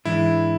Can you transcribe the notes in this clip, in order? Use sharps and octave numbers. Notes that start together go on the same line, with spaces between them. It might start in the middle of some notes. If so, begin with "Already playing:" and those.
G#2 E3 G#3 D4 E4